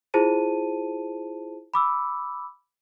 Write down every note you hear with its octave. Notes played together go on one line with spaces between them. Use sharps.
E4 F4 G#4 C5 A5 D#7
B5 D6 E6